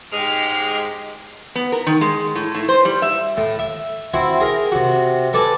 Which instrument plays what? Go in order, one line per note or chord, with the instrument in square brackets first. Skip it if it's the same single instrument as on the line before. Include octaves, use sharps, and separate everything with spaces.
[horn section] G#2 G#3 [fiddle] G4 F6
[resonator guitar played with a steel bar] B3
A#4
D#3
G#3
A2
A2
C5
G3
E5
[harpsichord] A2
E5
C4 E4 F#4
G#4 A#4
C3 F#4
A4 B4 D5 G#5 A5